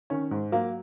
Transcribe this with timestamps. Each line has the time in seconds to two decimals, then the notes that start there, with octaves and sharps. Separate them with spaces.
0.10 D#3 C#4
0.31 G#2
0.52 F#3 A#3